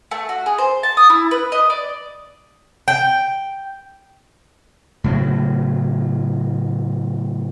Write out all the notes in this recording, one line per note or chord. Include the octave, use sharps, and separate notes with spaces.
A3
F#4
G#4
C5
A5
D#6
E4
B4
D#5
D5
G5
A2 C#3 F#3